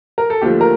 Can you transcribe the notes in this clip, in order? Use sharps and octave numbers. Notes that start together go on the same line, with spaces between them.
A#4
A4
D#2 D3 F3 A3 G4
A#4